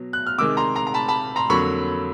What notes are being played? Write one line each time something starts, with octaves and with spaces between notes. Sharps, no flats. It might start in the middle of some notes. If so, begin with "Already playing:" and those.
Already playing: B2 F#3
F#6
F6
C3 D#3 G#3 D6 E6
A#5 C6
A#5 C6
A#5
A5 B5
A5 B5
A#5 C6
F2 D3 F#3 A#3 B5 C#6